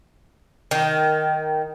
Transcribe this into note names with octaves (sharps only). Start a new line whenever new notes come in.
D#3